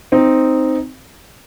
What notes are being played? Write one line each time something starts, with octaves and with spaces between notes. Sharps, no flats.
C4 D#4